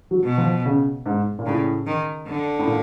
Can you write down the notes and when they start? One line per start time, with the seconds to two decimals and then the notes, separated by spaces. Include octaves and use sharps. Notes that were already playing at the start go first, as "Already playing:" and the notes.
0.11 F#3
0.24 B2
0.38 F3
0.65 C#3
1.06 G#2
1.39 A#2
1.46 A2 C#3
1.86 D#3
2.27 D3
2.59 A2
2.67 A#2